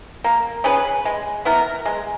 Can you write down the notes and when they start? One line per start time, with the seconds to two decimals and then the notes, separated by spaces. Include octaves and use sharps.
0.24 A#3
0.64 C#4 G#4 B4
1.05 G#3
1.45 B3 E4 A#4
1.85 G#3